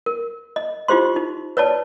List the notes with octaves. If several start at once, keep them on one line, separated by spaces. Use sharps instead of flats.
A#4
D#5
D#4 F4 G4 C5 C6
D#4
B4 C#5 D5 A5